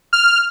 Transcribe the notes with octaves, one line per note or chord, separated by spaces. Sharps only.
F6